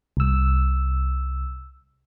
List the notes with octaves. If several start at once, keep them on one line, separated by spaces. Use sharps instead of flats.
C2 E6